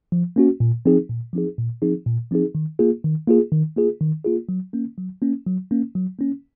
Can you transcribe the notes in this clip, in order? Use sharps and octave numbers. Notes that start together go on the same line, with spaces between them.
F3
A#3 C#4 F#4
A#2
F3 C4 D#4 G#4
A#2
F3 C4 D#4 G#4
A#2
F3 C4 D#4 G#4
A#2
F3 C4 D#4 G#4
D#3
A#3 F4 G#4
D#3
A#3 F4 G#4
D#3
A#3 F4 G#4
D#3
A#3 F4 G#4
F#3
A#3 C#4
F#3
A#3 C#4
F#3
A#3 C#4
F#3
A#3 C#4